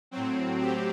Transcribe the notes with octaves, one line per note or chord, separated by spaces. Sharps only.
A2 F#3 C4
G4